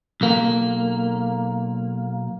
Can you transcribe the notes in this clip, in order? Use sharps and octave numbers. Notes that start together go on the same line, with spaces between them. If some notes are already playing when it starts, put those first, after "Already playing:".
B1 A#3